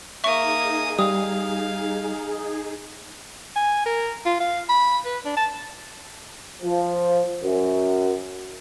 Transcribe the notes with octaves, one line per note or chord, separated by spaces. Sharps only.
A#3 D#4 G#4 E5 C#6 D#6
G3 F5 D#6
G#5
A#4
F4
F5
B5
B4
D4
A5
F3
F#2